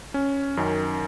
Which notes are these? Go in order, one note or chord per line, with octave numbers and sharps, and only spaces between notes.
C#4
F#2 D#3